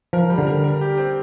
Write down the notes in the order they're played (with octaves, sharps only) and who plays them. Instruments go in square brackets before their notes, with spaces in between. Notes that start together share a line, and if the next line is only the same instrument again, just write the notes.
[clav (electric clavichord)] F3 [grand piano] A#4
[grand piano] G3
[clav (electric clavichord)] D3
[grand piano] A#4
A#4
G4
C4